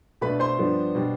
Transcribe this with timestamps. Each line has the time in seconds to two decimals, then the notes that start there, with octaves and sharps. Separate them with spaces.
0.21 B2 A3 D4 B4 B5
0.40 C5 C6
0.59 G2 F3 B3 D4
0.95 B2 G3 D4